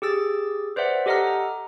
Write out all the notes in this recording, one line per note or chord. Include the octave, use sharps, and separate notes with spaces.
G4 G#4 E6 A6
B4 C5 D5 E5 F#5
G4 A4 D#5 F#5 A#5 F6
A#5